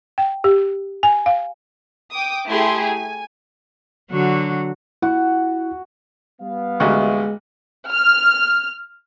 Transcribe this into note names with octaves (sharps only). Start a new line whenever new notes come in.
G5
G4
G#5
F5
G5 D6 D#6
A3 E4 G4 G#4 C6
G#5
D3 F#3 F#4
E4 F#4
G3 B3 F5
A1 D2 G#3 D#5 E5 C#6
F6